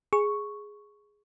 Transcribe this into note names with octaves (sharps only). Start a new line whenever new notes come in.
G#4 C#6